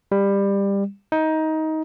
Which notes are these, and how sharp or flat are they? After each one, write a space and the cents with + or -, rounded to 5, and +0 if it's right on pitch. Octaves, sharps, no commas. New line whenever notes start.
G3 +20
D#4 +20